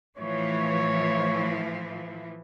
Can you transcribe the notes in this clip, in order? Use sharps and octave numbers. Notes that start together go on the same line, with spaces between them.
A2 E3 F3 C#5